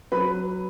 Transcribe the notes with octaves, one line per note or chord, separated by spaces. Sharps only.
F#3 B4 B5